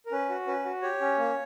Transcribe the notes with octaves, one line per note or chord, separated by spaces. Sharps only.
A#4
C#4 B4
F#4
C#4 B4
F#4
G4 C#5
C#4
A#3